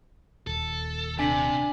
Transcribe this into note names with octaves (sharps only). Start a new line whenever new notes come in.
D#1 A4
C3 D4 G#5 B6 F#7